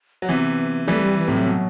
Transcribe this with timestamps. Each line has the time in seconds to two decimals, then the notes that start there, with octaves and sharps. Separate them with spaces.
0.22 F#3
0.29 C3 E3 B3
0.88 E3 G3 A3
1.02 G3
1.18 E3
1.28 A2 C3
1.33 F#3
1.47 B2